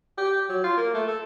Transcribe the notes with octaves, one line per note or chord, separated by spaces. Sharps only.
G4
F#3
F4
A#3
A3
A4